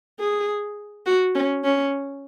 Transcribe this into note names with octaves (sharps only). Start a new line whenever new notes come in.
G#4
F#4
C#4
C#4